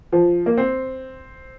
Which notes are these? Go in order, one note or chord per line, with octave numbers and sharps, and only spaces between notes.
F3
A#3
C4